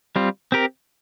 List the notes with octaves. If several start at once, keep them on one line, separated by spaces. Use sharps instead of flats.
G3 C4 F4
C4 G4 A#4